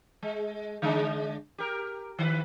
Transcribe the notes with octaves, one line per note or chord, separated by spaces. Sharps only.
G#3
D3 G#3 D4
G4 A#4
D#3 B4